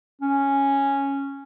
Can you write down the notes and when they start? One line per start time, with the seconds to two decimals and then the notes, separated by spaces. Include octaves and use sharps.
0.22 C#4